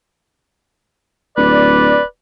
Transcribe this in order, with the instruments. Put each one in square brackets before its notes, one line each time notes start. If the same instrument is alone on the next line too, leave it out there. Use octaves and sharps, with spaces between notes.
[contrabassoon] D1 [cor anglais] B4 [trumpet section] D5